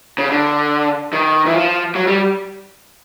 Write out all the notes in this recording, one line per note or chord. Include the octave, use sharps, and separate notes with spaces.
C#3
D3
D#3
E3
F3
F#3
G3